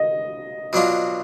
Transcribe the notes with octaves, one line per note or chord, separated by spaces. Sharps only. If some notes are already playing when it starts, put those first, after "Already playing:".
Already playing: D#5
B2 F#3 D4 F4